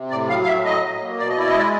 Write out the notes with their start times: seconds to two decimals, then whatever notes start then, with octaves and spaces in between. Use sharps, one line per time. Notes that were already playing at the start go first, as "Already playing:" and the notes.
Already playing: C3
0.11 A2 D5
0.29 F#3 F5
0.43 F5
0.47 A2 E5
0.65 F#3 D#5
0.83 F#3
1.01 A#3
1.19 B2 D5
1.29 D#5
1.37 E4 D5
1.47 D#5
1.55 G#3 D5